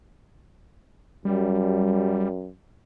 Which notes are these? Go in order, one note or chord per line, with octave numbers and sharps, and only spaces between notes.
F#2 G3